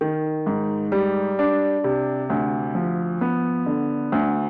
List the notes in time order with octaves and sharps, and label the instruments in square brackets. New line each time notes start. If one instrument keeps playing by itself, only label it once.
[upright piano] D#3
G#2
G3
D4
C3
D2
F3
B3
D3
D2